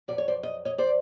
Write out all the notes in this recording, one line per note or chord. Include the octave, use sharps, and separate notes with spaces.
F2 C#3 F#3 D5
C#5
C5 D5
D#5
C#5 D#5
C5 D5